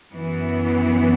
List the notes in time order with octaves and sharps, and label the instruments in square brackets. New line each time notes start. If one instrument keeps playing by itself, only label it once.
[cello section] F#2 E3 B3